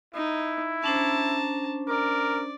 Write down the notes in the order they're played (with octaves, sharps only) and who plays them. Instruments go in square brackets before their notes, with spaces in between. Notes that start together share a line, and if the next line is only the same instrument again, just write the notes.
[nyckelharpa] D#4 [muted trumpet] E4
[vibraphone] C#4 D4 C5 [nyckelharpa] A5 A#5
[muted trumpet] A#4 [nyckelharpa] D5